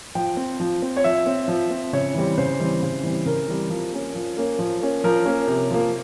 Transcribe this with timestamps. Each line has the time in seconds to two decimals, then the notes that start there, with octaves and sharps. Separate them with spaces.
0.15 F3 G5
0.37 C4
0.60 F3
0.82 C4
0.97 C#5
1.04 F3 E5
1.26 C4
1.48 F3
1.70 C4
1.93 C#3 C#5
2.14 E3 G3 C4
2.38 C#3 C5
2.60 E3 G3 C4
2.82 C#3
3.03 E3 G3 C4
3.26 C#3 A#4
3.48 E3 G3 C4
3.70 F3
3.93 A#3 C#4
4.15 F3
4.37 A#3 C#4
4.59 F3
4.81 A#3 C#4
5.04 F3 A#4
5.25 A#3 C#4
5.47 C3
5.71 F3 A#3